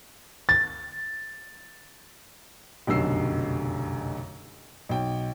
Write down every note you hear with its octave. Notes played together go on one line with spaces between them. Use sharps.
A6
F1 B1 F#2 D3 E6 C7
B1 G5